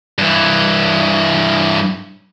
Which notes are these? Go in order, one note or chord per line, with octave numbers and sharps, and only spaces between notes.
G2 E3